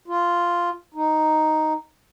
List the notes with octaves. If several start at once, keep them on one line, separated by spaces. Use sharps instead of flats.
F4
D#4